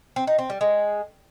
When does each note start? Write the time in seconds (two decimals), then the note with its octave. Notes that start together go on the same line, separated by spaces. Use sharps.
0.16 C4
0.27 D#4
0.39 C4
0.50 G3
0.61 G#3